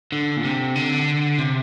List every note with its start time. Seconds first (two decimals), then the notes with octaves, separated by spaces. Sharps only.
0.12 D3
0.37 A#2
0.44 C3
0.76 D3
1.38 C3